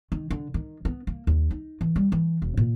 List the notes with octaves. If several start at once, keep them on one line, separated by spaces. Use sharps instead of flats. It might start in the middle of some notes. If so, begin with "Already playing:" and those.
D#3
D3
D#3
B3
A#3
D#2
D#4
E3
G3
E3
E1
A#2